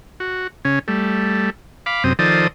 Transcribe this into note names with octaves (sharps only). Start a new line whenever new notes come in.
F#4
C#3 C#4
G3 A3
F5 B5 D6
F#2 C3 C4 D#6
D#3 F3 A4 C5 D5 D#6